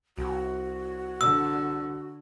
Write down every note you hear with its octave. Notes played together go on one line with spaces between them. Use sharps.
C2 F#4
D3 E6